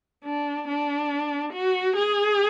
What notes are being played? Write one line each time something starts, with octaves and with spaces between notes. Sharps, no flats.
D4
D4
F#4
G#4